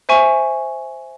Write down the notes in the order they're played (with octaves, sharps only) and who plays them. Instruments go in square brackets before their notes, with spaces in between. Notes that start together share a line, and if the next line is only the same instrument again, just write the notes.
[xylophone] C5 E5 G#5 C#6